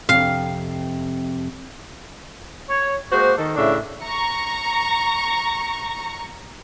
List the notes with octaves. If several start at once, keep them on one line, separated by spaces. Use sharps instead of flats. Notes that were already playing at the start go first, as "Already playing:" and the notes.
F2 C3 F5
C#5
G#3 A#3 F#4 C5
D#3 A4
A2 C#3 D4 E5
A#5 C#6